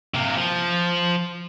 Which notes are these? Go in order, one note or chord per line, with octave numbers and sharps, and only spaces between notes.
C3 A#3
F3